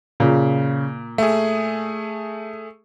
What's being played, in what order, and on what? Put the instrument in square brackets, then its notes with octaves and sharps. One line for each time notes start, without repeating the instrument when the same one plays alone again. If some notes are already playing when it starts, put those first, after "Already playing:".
[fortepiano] A#2 [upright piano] C#3
[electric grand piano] A3 G#4 [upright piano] E5